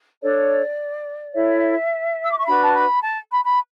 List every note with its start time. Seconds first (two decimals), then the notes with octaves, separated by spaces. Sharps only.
0.22 D4 A4 C#5 D5
1.35 E4 A4 C#5 E5
2.25 E6
2.32 D6
2.39 C#6
2.46 D4 F#4 B4 B5
2.63 A5
2.74 B5
3.02 A5
3.31 B5
3.44 B5